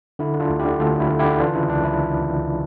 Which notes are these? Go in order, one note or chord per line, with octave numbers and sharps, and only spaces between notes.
D3 E4
D3
D4 F4
D2
D3 E4 G4
D2 F4 A4
D3
E4
D3
E4 G4
D3
E3 D4 F4
C#3 E4
C#2 D4
E4